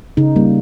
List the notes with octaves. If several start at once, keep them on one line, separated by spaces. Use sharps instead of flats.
C#3 D#4
G3 A#3